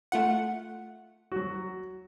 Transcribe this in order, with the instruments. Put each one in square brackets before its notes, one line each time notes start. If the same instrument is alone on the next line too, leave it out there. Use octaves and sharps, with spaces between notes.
[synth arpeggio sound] A3 F4 F#5
[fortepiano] F#3 F#4